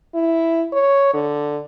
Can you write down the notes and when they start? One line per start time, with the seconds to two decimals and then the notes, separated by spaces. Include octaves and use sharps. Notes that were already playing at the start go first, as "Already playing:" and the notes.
0.14 E4
0.73 C#5
1.14 D3